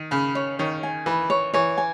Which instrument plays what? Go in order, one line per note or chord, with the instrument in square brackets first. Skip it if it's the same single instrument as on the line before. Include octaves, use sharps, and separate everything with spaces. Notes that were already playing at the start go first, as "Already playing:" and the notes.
Already playing: [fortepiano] D#3
[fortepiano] C#3 [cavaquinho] B5
[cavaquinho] C#5
[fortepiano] D#3 [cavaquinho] C#5
[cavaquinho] G#5
[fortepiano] E3 [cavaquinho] B5
[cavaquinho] C#5
[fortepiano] E3 [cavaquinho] C#5
[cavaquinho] G#5